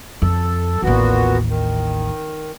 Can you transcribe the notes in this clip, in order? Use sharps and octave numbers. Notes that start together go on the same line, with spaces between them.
F2 A4
A1 D#2 A#2 B3 F#4
D#3